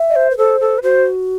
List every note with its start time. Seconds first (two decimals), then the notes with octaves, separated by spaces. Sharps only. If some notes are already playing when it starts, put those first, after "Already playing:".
Already playing: E5
0.10 D#5
0.16 C5
0.30 B4
0.37 A4 C5
0.60 A4
0.78 B4
0.83 F#4 C5